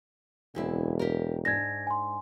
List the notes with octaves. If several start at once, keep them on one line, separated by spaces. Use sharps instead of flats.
E1 D2 C4 E4
G4 A#4
G#2 D4 G#6 A#6
G#5 C6